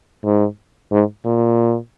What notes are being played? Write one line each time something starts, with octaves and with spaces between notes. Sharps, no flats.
G#2
G#2
A#2